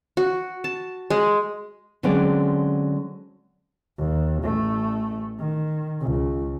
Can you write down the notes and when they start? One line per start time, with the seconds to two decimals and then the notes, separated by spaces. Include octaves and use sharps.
0.17 F#4
0.64 A5
1.10 G#3
2.03 D3 F#3 G#3 C4 C#4 D5
3.98 D#2
4.43 A1 A3
5.39 D#3
6.01 C#2